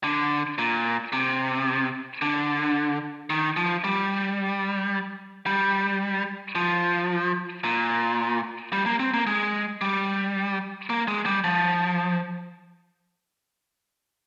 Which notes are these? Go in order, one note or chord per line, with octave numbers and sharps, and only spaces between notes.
D3
A#2
C3
D3
D#3
F3
G3
G3
F3
A#2
G3
A#3
C4
A#3
G#3
G3
A#3
G#3
G3
F3